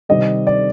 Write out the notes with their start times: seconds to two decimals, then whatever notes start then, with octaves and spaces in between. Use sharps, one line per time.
0.09 C3 D#3 G3 C4 D#5
0.47 D5